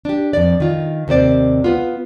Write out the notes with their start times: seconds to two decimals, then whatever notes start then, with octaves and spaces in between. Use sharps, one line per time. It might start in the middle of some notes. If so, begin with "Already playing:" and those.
0.05 D4 G4
0.33 F2 C3 D5
0.60 D#3 F4
1.08 D#2 C3 C5 D5
1.64 B3 F4